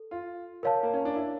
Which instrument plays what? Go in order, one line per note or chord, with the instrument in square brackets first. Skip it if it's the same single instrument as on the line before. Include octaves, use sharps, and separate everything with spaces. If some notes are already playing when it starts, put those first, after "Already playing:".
Already playing: [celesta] A4
[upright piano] F4
[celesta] A#4 C#5 F5 A5
[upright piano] A#3
C#4
D4
E4